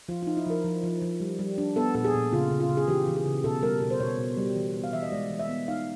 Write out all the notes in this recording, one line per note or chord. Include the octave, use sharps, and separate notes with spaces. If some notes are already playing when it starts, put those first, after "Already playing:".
F3 F4
F4
D#4
E4
F3 A#4
F3
F3
F3
G3
G3
D4
B3 A4
A#2 A4
G#4
A#2
C#3 F4
C#3
F4
C#3
G#4
E3 G4
E3
G#4
C#3
B2 A4
G3 A#4
B2
C5
B2 C#5
B2
G3
E3
B3
F5
E3 E5
D#5
G#3 D5
E3
E5
B3
D#4 F5